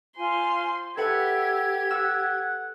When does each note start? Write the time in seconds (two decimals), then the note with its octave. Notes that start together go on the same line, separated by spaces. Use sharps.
0.17 F4 C5 G#5 C6
0.97 G4 A4 B4 E5 F#5 G#6
1.91 F#5 E6